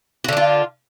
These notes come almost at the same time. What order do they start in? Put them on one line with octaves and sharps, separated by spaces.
F#4 D3 D4 F4